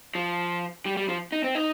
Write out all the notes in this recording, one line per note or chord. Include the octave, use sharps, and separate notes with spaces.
F3
G3
G3
F3
D#4
C4
D#4